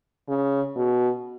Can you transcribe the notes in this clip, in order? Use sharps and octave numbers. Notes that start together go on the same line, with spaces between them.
C#3
B2